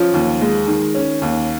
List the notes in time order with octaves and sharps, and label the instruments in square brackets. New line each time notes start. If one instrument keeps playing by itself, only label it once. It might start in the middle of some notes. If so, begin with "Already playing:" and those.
Already playing: [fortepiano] F3 [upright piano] C#4
[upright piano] D#2
G#3
D#3
C#4
D#2